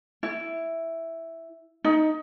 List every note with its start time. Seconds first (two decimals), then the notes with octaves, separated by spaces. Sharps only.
0.23 E4
1.85 D#4